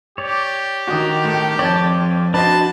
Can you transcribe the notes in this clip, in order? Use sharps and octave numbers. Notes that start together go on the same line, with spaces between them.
G4 C#5 D5
D#3 F#4 D#6
A2 A4
F2 C#5 D5 G5 A5
D4 F#4 B4 C5 D#5 A5